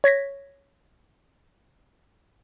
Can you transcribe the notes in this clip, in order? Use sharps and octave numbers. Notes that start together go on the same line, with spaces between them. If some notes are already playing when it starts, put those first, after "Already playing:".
C#5 G#6 A#6 B6